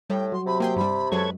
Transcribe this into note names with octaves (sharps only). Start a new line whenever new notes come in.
A2 G3 G5
F#3 C6
C3 B5
A#3 G#4 G5 C6
G2 G3 B5
F#2 F#3 G#3 A4 B4 C#5 G#6